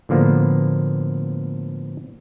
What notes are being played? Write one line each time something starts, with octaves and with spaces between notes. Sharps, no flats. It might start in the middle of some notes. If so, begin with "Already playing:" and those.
A2 D3 F3 A#3 B3